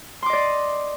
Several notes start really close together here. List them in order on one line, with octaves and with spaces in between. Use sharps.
C6 D6 D#5 D5